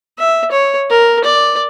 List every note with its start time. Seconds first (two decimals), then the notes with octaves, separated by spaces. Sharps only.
0.19 E5
0.51 C#5
0.90 A#4
1.24 D5